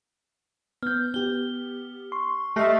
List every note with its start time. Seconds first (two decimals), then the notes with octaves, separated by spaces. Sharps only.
0.83 B3 F6 G6
1.14 B3 G4 G7
2.12 C6 C#6
2.56 A3 G4 D#5 F6 A#6 C7